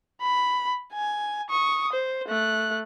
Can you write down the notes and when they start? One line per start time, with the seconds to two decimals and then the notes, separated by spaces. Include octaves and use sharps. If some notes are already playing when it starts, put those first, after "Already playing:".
0.21 B5
0.93 G#5
1.50 C#6 D#6
1.93 C5
2.28 A3 F#6